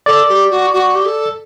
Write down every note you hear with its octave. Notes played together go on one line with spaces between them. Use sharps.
A4 D5
G4
F#4
F#4
G4
A4